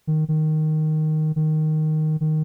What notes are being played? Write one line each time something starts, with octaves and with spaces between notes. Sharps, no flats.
D#3
D#3
D#3
D#3